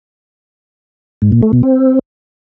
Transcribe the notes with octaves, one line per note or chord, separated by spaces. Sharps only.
G#2
A#2
A3
B2
C4